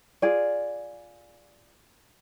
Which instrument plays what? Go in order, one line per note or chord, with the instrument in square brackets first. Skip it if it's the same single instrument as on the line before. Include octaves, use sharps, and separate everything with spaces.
[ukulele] F4 G#4 D5